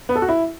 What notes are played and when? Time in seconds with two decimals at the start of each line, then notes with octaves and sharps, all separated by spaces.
0.09 B3
0.16 A4
0.22 F#4
0.29 E4